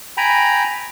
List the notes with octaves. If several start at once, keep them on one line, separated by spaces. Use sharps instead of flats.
G5 G#5 A#5 B5